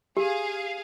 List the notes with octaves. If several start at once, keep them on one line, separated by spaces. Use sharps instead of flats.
G4 G#4 F5